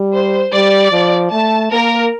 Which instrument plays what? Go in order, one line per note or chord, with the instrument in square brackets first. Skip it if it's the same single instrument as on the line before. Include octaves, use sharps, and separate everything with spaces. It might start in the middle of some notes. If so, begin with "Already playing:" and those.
Already playing: [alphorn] G3
[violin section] C5
[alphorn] G3 [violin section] D5
[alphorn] F3
[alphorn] A3 [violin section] A5
[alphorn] A#3 [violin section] A#4